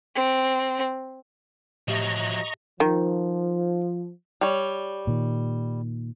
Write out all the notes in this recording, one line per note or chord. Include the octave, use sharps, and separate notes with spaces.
C4
A2 F3 F#3 G4 D#5 E5 A#5 C#6
D#3 F3
G3 C#5
A#2 D#3